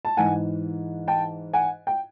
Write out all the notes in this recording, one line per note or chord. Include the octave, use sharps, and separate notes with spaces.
A5
G#2 E3 F#5 G#5
G5 A5
F#5 G#5
G5